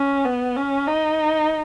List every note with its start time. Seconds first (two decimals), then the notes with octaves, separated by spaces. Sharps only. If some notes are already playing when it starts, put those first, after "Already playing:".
Already playing: C#4
0.25 B3
0.56 C#4
0.87 D#4